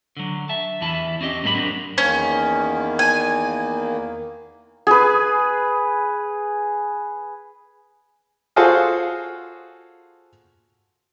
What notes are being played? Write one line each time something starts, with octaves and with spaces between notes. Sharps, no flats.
D3 F#3
E5 A5
E2 E3 E4 A5
C4 C#4 G4 D#5
G#2 F#3 A#3 G4 C5 B5
F#3 C4 D4 A#4
E2 D#3 A#3 C#4
G#5
G#4 B4
F4 F#4 G#4 A4 C5 F5